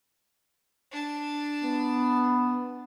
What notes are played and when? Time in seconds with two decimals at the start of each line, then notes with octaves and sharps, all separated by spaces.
0.91 D4 A5
1.64 B3